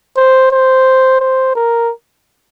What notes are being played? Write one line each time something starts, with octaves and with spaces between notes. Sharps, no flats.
C5
C5
C5
A#4